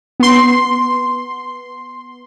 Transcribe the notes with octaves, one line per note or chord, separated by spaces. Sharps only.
B3 C6